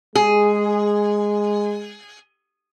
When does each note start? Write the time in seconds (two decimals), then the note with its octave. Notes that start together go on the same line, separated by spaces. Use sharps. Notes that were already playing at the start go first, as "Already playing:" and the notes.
0.15 G#3 G#4